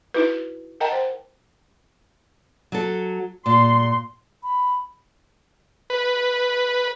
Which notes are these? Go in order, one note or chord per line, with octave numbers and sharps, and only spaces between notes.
D#4 E4 F#4 B4
A#4 D#5 F#5 G5 A5 A#5
C5
F#3 A4
A#2 C6
B5
B4